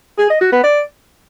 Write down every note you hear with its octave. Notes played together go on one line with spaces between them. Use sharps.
G#4
D#5
F#4
B3
D5